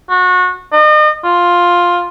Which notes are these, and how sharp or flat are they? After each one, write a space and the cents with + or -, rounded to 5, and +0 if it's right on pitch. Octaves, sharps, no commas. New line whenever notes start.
F#4 -25
D#5 -40
F4 +5